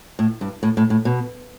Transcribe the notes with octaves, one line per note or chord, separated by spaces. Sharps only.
A2
G2
A2
A2
A2
B2